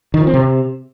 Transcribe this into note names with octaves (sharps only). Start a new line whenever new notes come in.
D#3
F3
C4
C3